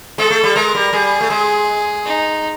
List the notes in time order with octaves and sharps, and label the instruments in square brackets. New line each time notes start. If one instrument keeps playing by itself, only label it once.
[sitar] G#3 [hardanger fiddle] A4
[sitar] A3
G3
[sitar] G#3 [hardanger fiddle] A#4
[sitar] G3
[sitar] G3 [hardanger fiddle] G#4
[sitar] A3
G#3
[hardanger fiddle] D#4